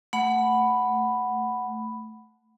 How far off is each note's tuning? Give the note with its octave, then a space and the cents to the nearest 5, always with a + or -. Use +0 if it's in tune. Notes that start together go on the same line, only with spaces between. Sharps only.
A3 +0 F#5 +0 B5 +0